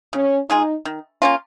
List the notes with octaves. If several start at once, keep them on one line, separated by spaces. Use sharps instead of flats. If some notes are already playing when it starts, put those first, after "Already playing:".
C#3 C#4
G#3 D#4 F4 G#4
D#3
A#3 C#4 F4